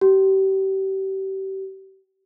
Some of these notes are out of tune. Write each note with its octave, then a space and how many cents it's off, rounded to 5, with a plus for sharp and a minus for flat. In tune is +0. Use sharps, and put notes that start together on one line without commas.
G4 -30